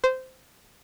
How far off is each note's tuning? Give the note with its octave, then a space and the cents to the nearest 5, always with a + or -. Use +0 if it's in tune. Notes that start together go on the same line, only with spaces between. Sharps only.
C5 -15